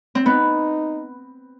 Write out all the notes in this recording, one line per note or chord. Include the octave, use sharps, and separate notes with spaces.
C4
B3 D#4